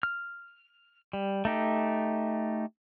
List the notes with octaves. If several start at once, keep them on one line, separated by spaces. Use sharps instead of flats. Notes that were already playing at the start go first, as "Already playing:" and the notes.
F6
G3
A3 D#4 G4